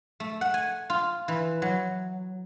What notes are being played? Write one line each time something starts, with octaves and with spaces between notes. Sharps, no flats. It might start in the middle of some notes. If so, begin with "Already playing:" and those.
A3
F#5
G#5
F4
E3
F#3